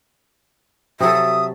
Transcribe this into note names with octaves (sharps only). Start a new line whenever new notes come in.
C3 F#3 A4 E5 D#6